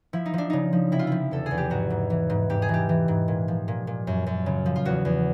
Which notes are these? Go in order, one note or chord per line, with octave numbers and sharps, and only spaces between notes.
F3 E4
D#4
F3 D4
C#3 D#4
F3
C3 E4
F4
F3 E4
E2 A4
E2 G#4
G4
G#2 F#4
G#2
E3
G#2
G#2 G4
G#4
E3 G4
E3
G#2
A#2
F3
A#2
A#2
F#2
F#2
C#3
F3
F4
E2 F#4
E2